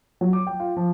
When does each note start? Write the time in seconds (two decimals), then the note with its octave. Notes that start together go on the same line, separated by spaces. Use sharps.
0.21 F#3
0.33 D6
0.47 G5
0.60 F4
0.77 F3